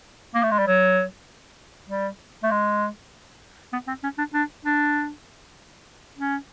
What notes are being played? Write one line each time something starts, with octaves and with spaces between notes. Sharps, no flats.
A#3
A3
G#3
G3
F#3
G3
A3
G#3
B3
C4
C#4
D4
D4
D4
C#4